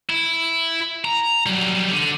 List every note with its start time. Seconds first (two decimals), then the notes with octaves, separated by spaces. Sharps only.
0.09 E4
1.05 A#5
1.46 F#3 G3
1.91 D3